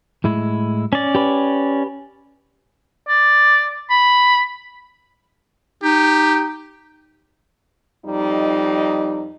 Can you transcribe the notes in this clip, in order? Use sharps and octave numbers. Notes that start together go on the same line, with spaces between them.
A2 G#3 E4
C#4 D5
G4 B4
D5
B5
D#4 G4
F2 G3 D#4